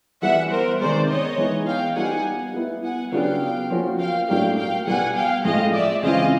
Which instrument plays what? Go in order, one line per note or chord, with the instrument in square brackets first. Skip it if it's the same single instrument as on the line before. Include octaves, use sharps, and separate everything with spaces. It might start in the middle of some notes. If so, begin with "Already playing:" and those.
[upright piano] E3 G3 B3 [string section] E5 F#5
[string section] A#4 C5
[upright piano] C3 D#3 G#3 B3 [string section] C5 D5
[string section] C#5 D#5
[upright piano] E3 G#3 B3 D#4
[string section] F5 G5
[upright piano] G3 B3 D#4 G4 [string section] F#5 G#5
[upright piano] G3 B3 E4
[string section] F#5 G#5
[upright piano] C#3 F#3 B3 D4 G4 [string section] F5 G5
[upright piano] F3 A#3 C#4 F#4
[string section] F5 G5
[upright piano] A2 F#3 A#3 D4 G4 [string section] F5 G5
[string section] F5 G5
[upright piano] B2 G3 B3 [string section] F#5 G#5
[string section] F5 G5
[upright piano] A2 F3 G#3 [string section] D#5 F5
[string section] D5 E5
[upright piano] C#3 E3 G#3 C4 F4 [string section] D#5 F5